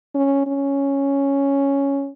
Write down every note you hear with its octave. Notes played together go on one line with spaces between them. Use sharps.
C#4
C#4